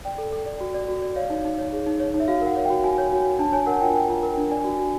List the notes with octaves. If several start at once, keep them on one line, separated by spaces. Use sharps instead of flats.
D5 G5
A4
A4
D5
F#4
D5
F#4
D5
C#5 F5
D#4
D#4
C#5
G#4
D#4
C#5
D#4
E5
F#4 F5
A#4 F#5
C#5
F#4 G5
F#4 G#5
C#5
F#4
F#4
D4 A5
C#5 G#5
A#4 F#5
F4 G5
A#4 G5
F4
A#4
D4
D5 G#5
F#4
F#4